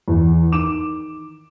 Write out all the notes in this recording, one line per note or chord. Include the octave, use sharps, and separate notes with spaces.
E2
D#3 D6 E7